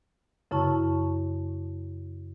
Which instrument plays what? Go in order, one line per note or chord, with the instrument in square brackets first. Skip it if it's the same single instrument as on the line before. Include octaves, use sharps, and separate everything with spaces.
[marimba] F#2 C#3 E4 A5 C#6